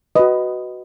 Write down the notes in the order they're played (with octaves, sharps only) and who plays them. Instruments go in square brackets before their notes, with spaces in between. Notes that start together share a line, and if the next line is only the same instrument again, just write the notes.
[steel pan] F#4 B4 D#5